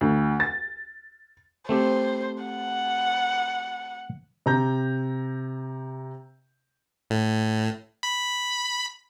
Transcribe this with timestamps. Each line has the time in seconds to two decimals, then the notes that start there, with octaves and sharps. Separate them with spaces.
0.01 D2
0.40 A6
1.69 A3 C4 G4 C5
2.44 F#5
4.46 C3 A#5 G6
7.10 A2
8.03 B5